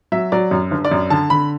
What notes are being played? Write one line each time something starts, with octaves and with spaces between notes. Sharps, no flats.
F#3 E5
F#3 D5
F#2
G1
D5
F#2
D3 A5
D3 B5